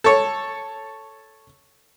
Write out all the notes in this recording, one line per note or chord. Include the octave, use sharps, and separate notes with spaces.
A4 C#5